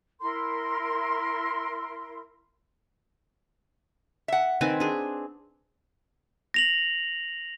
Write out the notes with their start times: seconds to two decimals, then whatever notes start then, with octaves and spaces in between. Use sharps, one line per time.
0.21 E4 A#4 C6
4.28 E5 F#5
4.61 D#3 C4 B4 G#5
4.80 D4 G#4
6.54 A#6 F7 F#7